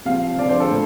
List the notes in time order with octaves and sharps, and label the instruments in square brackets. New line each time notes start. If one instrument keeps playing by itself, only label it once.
[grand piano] C3 F3 C4 F5
D3 F3 C4 D5
C5
A4
A2